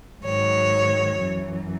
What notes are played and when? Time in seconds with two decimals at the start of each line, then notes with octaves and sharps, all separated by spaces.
0.23 G#2 D#3 F#3 C#5
1.19 F#2 E3